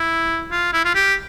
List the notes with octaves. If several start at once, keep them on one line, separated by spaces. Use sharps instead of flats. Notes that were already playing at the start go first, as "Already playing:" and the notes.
Already playing: E4
F4
E4
F4
G4